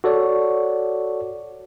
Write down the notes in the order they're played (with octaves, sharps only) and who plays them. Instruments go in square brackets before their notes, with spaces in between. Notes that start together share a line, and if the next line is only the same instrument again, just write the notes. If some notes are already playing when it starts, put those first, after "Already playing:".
[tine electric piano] F#4 A4 C#5 D5